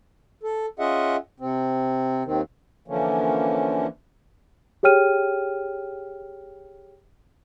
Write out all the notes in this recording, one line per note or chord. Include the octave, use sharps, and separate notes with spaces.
A4
C#4 F4 G#4 D#5 E5 F#5
C3 C4
D#2 D#3 C4
D3 E3 F3 A#3 C#4
G4 G#4 C#5 G5 F6 D#7